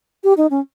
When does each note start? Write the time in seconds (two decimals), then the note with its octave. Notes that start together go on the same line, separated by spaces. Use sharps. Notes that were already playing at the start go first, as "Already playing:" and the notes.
0.24 G4
0.37 D#4
0.51 C#4